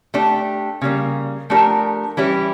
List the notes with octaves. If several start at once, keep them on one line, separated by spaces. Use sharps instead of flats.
A3 D4 G4
C#3 G3 A#3
F3 A3 D4 G4 A#4
E3 G3 C#4 E4 G4